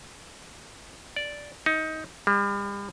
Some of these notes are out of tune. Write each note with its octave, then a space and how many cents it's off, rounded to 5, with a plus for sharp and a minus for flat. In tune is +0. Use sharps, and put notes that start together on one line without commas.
D5 -5
D#4 +20
G3 +40